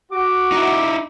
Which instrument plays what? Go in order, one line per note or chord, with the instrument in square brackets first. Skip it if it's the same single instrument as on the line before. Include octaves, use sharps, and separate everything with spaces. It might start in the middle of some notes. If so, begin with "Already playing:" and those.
[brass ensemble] F#4 [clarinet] D6
[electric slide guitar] D#4 E4